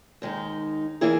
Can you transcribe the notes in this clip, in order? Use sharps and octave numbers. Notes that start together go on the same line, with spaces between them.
D#2 D#3 G#3 D#4
E3 A#3 E4 G#4